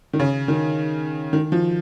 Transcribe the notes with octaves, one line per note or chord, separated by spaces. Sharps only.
D#3
C#3
D#3
D#3
F3